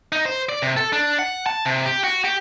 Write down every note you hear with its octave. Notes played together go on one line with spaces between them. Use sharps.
D#4
C5
D5
C3
A4
D4
F#5
A5
C3
G4
F#4
G4